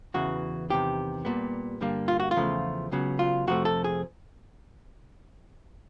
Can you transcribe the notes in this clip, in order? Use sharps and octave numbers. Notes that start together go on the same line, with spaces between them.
E2 C#3 E3 F#4
E2 C3 D#3 G4
A#2 G3 B3
G2 D3 G3 A#3
F4
F#4
F4
E2 C#3 F3 A3
C#2 C#3 F#3 B3
F4
F2 C3 F3 A3 F#4
A4
G#4